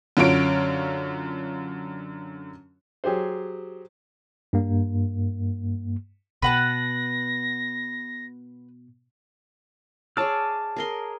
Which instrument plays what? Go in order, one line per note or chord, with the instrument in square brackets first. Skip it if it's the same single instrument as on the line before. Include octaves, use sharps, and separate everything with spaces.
[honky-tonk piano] F#2 D3 F4 C#5 D7
[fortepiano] F#3 G4 G#4 C5
[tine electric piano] G2 A#3
[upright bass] B2 [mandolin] B4 F#5 A5 [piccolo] A#6
[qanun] G#4 C#5 D5 [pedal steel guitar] A5 E6 F6
[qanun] G#4 A#4 C6